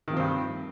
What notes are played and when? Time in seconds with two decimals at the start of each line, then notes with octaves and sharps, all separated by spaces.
0.08 D#3
0.11 C3
0.14 F3
0.17 C4
0.20 G2